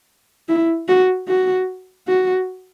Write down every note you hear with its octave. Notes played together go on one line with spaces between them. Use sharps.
E4
F#4
F#4
F#4